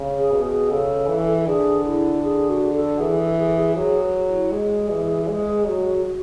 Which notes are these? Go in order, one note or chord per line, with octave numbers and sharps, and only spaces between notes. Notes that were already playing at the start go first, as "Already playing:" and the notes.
Already playing: C#3
G#4
B2
G#4
C#3 A4
E3
D3 G#4
E4
G#4
F#4
A4
E3 G#4
A4
G#4
G#4
F#3 G#4
E4
G#3 G#4
E3
G#3 G#4
F#3 F#4
F#4